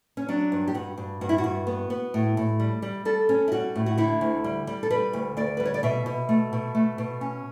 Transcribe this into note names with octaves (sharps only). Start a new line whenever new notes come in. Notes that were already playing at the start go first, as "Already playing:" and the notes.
C#4
F#3 D4
G2
G4
G2 F#4
G2
G2 F#4
E4
F#4
G2
B3
B3
A2
A2
G3
G3
G3 A4
C#4
E4
G3 F#4
A2
F#4
D3 E4
D2
G3
G3
A4
G3 B4
D2
D2 D5
G3 B4
C#5
D5
B2 E5
B2
A3
B2
A3
B2
C#4